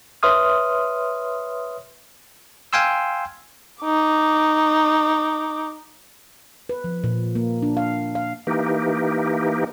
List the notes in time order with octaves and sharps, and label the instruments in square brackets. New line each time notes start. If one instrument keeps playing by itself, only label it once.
[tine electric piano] B4 C#5 E5 C6 D#6 F6
F5 G5 G#5 C6 E6
[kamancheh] D#4 D6
[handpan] B4
F3
A#2
A#3
D4
F5
F5
[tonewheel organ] E3 A#3 D#4 G4